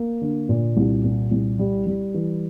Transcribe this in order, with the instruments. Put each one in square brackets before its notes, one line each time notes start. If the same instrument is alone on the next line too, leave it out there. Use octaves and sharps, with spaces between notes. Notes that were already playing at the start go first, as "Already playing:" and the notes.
Already playing: [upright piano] A#3
D3
A#2
C2
A#2
C2
G3
G3
E3